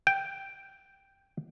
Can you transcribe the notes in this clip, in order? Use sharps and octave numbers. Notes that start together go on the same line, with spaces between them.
G5